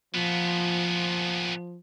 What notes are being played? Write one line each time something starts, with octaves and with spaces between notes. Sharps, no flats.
A#2 F3 B3